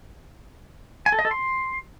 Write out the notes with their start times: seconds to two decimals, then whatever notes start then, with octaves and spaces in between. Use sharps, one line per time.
1.06 G#5
1.12 A4
1.19 D#5
1.25 A4
1.31 C6